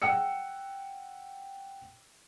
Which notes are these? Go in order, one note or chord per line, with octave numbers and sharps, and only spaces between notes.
F#5 G5 E6 C#7